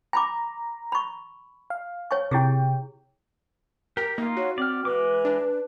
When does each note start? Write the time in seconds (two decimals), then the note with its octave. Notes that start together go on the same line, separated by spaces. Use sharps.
0.13 G#5 A#5 B5 D6
0.92 B5 C#6
1.70 F5
2.11 C#5 G#5 C#6
2.31 C3 E4 G4 G#4 G5
3.97 G4 A#4
4.18 A#3 D#4 F4
4.37 F#4 C#5
4.58 C4 D5 F6
4.85 E3 G#3 B4 D6
5.25 D4